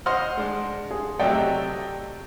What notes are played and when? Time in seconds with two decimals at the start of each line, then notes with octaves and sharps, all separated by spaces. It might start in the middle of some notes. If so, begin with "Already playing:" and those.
0.06 C5 D#5 F#5 C6 F6
0.37 G#3 D4
0.91 G#4
1.20 C3 F#3 A3 D5 D#5 G5